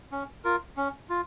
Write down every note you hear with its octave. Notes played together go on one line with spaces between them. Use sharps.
C#4
F4 A#4
C#4
F4